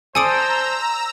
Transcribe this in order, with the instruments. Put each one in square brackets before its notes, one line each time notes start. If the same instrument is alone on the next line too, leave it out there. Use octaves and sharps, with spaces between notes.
[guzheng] A4 D5 [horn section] C5 [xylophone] G#5 D#6 D7 [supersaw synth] A#5 E6